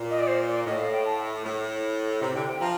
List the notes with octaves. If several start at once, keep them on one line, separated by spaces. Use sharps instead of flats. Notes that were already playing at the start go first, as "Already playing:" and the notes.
Already playing: A#2
D#5
D5
C5
D5
A2 D#5
F5
G5
A5
A2
C3 A#5
D3 G5
C3 G5
F3 A#5